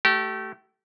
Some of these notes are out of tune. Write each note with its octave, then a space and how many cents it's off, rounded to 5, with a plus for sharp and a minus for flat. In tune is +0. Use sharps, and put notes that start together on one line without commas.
A3 +0 G4 -30